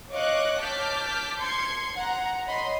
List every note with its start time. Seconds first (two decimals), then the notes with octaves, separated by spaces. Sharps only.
0.12 C#5 D#5 F5 C#6 D6 F#6
0.61 A5 D6 F6 G6 B6
1.40 C6 G#6 C7 C#7
1.97 F#5 A#5
2.47 C#5 D#5 B5 C6